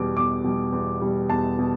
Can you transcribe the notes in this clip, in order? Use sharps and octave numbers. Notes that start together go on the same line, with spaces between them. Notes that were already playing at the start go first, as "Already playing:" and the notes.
Already playing: E2 B2 G3 D6
E2 D6
B2 G3
E2
B2 G3
E2 A5
B2